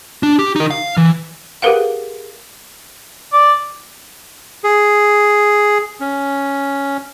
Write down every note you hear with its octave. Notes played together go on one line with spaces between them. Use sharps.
D4
G4
D#4 A#4
F5
E3
G4 G#4 A#4 B4 F5 F#5
D5
G#4
C#4